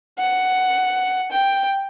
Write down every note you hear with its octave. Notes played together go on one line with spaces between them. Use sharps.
F#5
G5